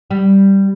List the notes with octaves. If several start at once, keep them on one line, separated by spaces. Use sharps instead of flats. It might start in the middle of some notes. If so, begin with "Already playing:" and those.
G3